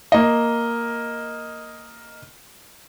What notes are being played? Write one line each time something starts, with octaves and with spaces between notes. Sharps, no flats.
A#3 D#5